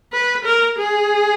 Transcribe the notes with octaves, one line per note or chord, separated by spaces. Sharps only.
B4
A#4
G#4